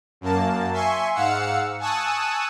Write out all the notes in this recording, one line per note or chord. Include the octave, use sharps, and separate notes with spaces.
F#2 A#3 A5
E5 G#5 C6 C#6
G#2 F5 F#5 E6 C#7
G#5 A5 C#6 D#6 E6 F#6